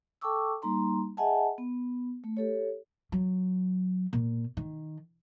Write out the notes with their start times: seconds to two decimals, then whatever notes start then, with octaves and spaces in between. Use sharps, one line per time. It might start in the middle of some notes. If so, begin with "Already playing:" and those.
0.21 A4 G5 A5 C#6 D6 E6
0.62 G3 A#3 D#4 A#5 C6
1.17 G#4 D#5 E5 F#5 G#5 A5
1.58 B3
2.24 A3
2.37 G4 A4 C#5
3.12 F#3
4.13 A#2
4.57 D#3